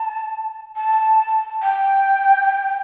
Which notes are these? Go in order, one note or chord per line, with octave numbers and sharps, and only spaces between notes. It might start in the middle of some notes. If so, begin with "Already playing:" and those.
Already playing: A5
A5
G5